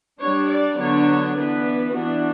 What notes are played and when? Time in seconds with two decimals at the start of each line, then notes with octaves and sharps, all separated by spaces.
0.20 G3 D4 C#5
0.50 D5
0.78 D3 F#3 B3 D4 C#5
1.37 E3 B3 D4 B4
1.94 E3 B3 D4 F#4